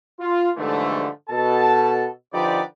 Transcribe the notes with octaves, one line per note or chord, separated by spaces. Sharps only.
F4
G#2 D3 E3 F3 G3 A3
B2 A4 A5
D3 F3 D#4 G4 B4 D5